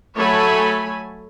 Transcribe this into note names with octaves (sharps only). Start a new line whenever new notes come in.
F#3 A3 A4 C#5 G#5 B5